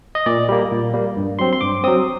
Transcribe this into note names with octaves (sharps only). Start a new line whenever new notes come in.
D#5
A#2 D5
G3 A#3
A#2
G3 A#3
G2
F#3 C4 C6
C6
G2 D6
F#3 C4 D#6